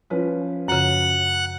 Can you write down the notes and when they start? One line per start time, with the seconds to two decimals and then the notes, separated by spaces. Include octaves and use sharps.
0.10 F3 C#4 B4
0.68 F#2 C#3 F#5 F#6